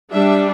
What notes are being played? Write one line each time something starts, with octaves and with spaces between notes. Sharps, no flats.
G3 D4 E5